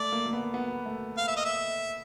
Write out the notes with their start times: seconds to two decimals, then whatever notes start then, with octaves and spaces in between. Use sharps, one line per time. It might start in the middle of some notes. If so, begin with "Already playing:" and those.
Already playing: A3 D5
0.12 A#3
0.26 A#3
0.33 B3
0.54 B3
0.86 A3
1.18 F5
1.28 E5
1.37 D#5
1.45 E5